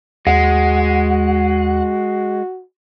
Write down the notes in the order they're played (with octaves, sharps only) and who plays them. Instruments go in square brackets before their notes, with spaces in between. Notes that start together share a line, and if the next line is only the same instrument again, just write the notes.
[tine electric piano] D#2 [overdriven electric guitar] G#3 [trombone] F#4 [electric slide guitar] F#5